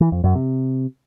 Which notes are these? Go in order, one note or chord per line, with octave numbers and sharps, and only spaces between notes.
E3
F2
F#2
C3